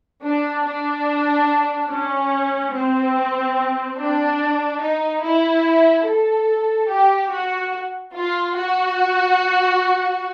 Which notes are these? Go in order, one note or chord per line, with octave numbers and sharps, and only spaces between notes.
D4
D4
C#4
C4
D4
D#4
E4
A4
G4
F#4
F4
F#4